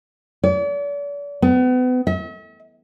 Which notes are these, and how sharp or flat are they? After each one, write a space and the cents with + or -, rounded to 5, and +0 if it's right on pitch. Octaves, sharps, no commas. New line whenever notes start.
D5 -40
B3 +35
E5 -45